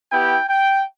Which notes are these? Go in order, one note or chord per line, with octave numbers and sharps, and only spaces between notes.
B3 E4 G4 G5
G5